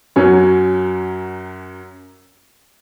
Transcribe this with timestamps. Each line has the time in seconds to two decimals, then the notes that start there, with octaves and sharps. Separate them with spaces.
0.16 F#2 F#3 C#4